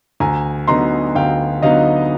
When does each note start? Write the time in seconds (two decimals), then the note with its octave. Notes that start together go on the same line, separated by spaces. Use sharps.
0.20 D2 G#5 A#5
0.68 D3 F#3 B3 D#4 A#5 C6
1.15 D2 F5 G5
1.62 D3 F#3 B3 D#4 D#5 F5